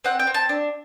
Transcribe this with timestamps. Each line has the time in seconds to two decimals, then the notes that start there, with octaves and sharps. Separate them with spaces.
0.05 C4 F#5
0.19 G5
0.27 C4
0.34 A5
0.49 D4